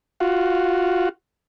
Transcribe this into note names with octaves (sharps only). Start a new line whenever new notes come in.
F4 F#4